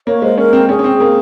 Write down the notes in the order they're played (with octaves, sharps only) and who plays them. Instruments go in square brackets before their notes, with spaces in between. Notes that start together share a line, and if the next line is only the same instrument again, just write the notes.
[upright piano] A#3 [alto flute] C#5
[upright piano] G#3 [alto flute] C5
[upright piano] C#4 [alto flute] A#4
[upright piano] C4
[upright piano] C#4 [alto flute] G#4
[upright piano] C#4
C4
A#3